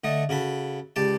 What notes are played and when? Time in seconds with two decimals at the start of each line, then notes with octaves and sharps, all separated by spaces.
0.04 D3 A3 D#5
0.29 C#3 F#4 A4 B5
0.96 C#2 G4 D5 A5